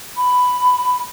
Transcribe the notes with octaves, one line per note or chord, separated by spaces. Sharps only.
B5